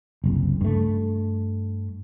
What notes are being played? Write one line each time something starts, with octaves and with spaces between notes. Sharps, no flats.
F#1 C2
G2 A3